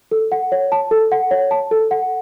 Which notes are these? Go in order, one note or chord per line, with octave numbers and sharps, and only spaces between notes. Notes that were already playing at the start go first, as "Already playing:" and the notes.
A4
F#5
C#5
A5
A4
F#5
C#5
A5
A4
F#5